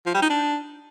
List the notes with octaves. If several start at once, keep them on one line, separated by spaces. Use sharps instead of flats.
F3
G3
D#4
D4